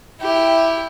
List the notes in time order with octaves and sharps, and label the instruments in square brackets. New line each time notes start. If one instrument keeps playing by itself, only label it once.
[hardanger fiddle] E4 G4